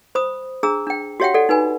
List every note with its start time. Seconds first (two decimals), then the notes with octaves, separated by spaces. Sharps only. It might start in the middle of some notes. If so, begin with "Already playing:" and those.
0.15 C5 B5 D#6
0.63 D4 G#4 A#5 E6
0.87 D4 G5
1.20 F#4 G4 C#5 E5 F#5 G5
1.34 A4 D5 F#5
1.49 D#4 B4 G#5 B5